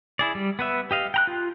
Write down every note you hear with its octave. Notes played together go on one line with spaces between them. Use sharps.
E4 G#4 D5
G3
B3 B4 E5
G4 D#5 F5
G5 A#5 F#6
F4